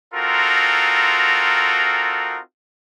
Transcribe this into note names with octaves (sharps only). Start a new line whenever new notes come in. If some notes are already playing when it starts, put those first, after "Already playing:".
C4 D#4 F4 F#4 A4 A#4